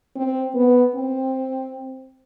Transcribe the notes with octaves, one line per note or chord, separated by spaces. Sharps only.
C4
B3
C4